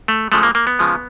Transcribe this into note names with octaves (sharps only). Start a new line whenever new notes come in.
A3
C#3 F3 G#3 A3
A#3
A#3
B3
C#3 F3 G#3